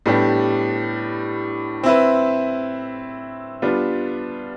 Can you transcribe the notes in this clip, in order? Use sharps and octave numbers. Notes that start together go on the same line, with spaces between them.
A2 G3 B3 D4 G4
C4 E4 B4
G3 B3 D4 F4